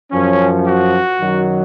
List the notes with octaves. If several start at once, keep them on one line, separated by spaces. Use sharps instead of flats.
F#2 F3 C#4
F#4
F#2 D#3 F#3